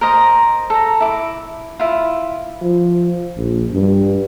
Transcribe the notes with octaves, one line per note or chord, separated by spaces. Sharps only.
A#4 C5 D#5 A#5
A4 A#5
E4 D6
E4 F4
F3
A#1
G2